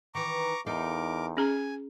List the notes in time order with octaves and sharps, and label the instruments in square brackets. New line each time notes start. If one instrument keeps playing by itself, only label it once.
[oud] D#3 E3 [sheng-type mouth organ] A#5 C#6 D6
[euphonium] E2 [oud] D#4 A4 F5 [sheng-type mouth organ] A#4 D6
[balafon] C#4 G#4 A#5 [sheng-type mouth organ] G#5